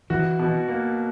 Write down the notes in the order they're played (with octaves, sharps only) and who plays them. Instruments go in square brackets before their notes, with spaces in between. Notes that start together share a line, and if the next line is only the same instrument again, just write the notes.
[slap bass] E3 [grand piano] F#4
[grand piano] B2
A#3